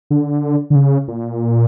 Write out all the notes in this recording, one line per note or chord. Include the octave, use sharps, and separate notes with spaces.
D3
D3
C#3
A#2